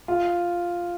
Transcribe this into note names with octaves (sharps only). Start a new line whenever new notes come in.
F4